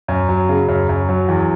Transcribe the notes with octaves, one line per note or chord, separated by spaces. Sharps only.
F#2
F#3
C#3
F#2
F#2
F#3
E2